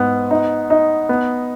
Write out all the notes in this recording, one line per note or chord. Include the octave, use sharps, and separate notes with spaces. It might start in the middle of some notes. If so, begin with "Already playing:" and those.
Already playing: G#2 B3
D#4
D#4
B3